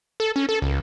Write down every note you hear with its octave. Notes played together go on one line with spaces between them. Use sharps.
A4
C#4
A4
C#2